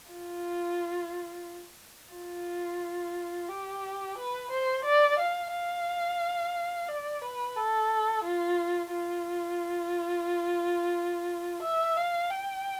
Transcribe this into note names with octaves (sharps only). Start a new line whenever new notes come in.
F4
F4
G4
B4
C5
D5
F5
F5
D5
B4
A4
F4
F4
E5
F5
G5